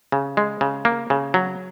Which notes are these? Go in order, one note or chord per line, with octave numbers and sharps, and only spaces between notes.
C#3
G#3
C#3
A#3
C#3
F#3